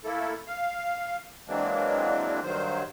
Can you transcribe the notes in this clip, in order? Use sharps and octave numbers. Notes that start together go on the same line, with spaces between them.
A3 A#3 E4 A4
F5
E3 F#3 G#3 A#3 C4 D4
G2 D#3 F#3 C5